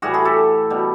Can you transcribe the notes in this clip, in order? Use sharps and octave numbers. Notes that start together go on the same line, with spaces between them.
A2 E3 G3 F#4 G#4
F#4 G#4
G4 A4
B2 G3